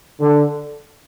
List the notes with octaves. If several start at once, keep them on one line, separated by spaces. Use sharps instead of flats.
D3